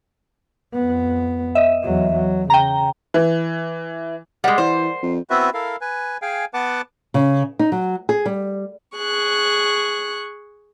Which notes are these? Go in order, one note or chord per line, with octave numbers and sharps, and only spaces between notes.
F2 B3
D#5 E5
E2 F#3
F#3
C#3 G5 A#5
E3
G3 G#3 A#4 D5 F#5
E3 C5
F2
B3 C4 E4 F#4 B4 E5
E4 A4 A#4 F5
B4 G#5
G#4 F5 G5 G#5
B3 B4 F#5 A5 D6
C#3
D#4
F#3
G#4
G3
G#4 C#6 F#6